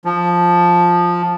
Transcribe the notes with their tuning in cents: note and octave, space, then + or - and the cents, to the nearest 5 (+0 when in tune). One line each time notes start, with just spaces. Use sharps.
F3 +5